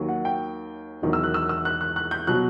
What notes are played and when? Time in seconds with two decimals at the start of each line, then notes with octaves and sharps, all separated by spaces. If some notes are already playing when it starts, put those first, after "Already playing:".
Already playing: D#2 D#3 F#3
0.09 F#5
0.25 G5
1.02 E1 E2 D#3 F#3
1.13 E6
1.24 F#6
1.34 E6
1.49 E6
1.65 F#6
1.81 F#6
1.96 F#6
2.11 G6
2.27 B2 F#3 F#6